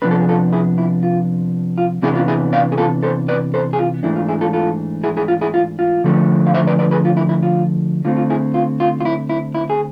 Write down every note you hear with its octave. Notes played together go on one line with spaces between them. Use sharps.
C3 F3 B3 D4 B4
A4
G#4
F4 A4
E4 G#4
E4
F4
F4
C3 E3 B3 D4 E4 G#4
F4
E4 G#4
D5 F5
G#4
F4 A4
A4 C5
B4 D5
A4 C5
G#4
F4
G#2 E3 A3 D4 E4
F4
E4 G#4
F4 A4
F4 A4
E4 G#4
E4 G#4
F4
E4 G#4
F4
F4
D3 F3 A3 D4
F5
C5 E5
B4 D5
B4 D5
G#4 B4
F4
E4
E4
F4
D3 A3 C4 F4
F4
E4 G#4
F4
F4
F4
E4
E4
E4
G#4